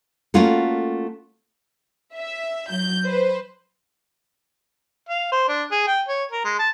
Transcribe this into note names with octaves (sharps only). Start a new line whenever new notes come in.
A3 A#3 C#4 F4 F#4 A4
E5
F#3 G6
B4 C5
F5
C5
D4
G#4
G5
C#5
A#4
G#3
A5